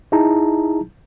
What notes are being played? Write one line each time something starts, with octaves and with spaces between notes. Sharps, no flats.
D#4 E4 G#4 A5 A#5